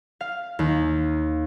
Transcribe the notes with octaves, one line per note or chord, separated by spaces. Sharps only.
F5
D#2